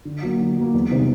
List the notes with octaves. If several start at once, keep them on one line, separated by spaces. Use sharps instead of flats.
D3
F#3 A#3
D3
F#3 A#3
E2
C3 D#3 G3 C4